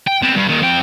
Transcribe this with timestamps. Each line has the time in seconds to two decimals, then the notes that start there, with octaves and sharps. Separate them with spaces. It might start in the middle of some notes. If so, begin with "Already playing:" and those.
0.08 G5
0.23 B3 C4
0.35 G2
0.48 A#2 D#3
0.61 F2 G5